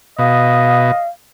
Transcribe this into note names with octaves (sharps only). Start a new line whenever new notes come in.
B2 D#5 F5